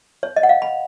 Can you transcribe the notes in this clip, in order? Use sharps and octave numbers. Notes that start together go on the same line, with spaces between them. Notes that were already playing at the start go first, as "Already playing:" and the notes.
C#5
D#5
F#5
F5
B5